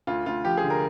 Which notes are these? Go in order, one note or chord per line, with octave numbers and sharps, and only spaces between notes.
D2 F4
D2 F4
F3 G4
G#4
D3
A#4